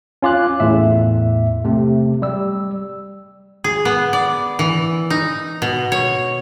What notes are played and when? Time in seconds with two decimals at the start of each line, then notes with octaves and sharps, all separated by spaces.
0.22 C#4 F4 D6 F#6
0.60 E2 A2 E5
1.65 C3 A3
2.22 G3 E6
3.64 G#4
3.85 B3
4.13 D5
4.59 E3
5.10 D#4
5.62 B2
5.92 C#5